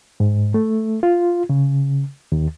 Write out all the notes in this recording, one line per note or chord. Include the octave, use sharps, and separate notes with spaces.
G#2
A3
F4
C#3
D#2